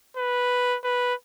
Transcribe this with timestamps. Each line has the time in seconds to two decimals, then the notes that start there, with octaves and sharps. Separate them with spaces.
0.17 B4
0.84 B4